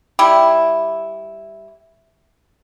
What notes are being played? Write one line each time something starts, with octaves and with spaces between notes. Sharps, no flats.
G3 E4